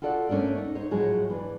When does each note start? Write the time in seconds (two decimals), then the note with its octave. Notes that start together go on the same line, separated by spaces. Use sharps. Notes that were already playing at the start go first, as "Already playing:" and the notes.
0.02 F4 F#4 A4 D5 D#5 F#5
0.29 A3 C#4 D4 A#4 D5
0.58 D#4
0.75 D#4 C5 C#5
0.91 A2 F3 F#3 G#3 G#4
1.30 E3 D4